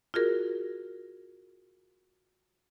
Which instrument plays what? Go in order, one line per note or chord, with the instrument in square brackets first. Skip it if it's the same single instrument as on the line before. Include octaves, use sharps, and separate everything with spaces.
[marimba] F4 F#4 G#4 A#4